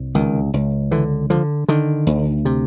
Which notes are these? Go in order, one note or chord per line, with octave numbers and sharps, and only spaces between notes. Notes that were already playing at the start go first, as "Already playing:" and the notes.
Already playing: C2
C#2 D#3
C#2
D3 E3
D3 F3
D3 D#3
D2
C3